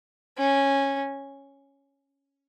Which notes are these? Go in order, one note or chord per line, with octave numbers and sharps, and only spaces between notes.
C#4